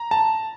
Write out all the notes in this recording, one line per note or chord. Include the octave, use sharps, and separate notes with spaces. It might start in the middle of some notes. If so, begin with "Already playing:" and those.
Already playing: A#5
A5